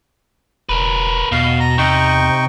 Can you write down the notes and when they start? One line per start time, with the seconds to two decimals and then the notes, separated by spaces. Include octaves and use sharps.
0.69 E1 A#4 B4
1.32 E2 B2 F5
1.60 A#5
1.78 C3 D#4 G5 C#6